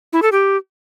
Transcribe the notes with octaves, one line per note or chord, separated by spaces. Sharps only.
E4
A4
G4